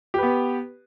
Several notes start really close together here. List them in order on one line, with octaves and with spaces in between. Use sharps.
G4 B4 B3